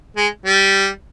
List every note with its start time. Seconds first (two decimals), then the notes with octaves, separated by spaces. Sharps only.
0.17 G#3
0.46 G3